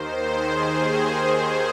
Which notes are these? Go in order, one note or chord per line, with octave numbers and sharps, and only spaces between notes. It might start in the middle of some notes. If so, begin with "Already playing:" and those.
Already playing: D#2 D#3 C5
G#4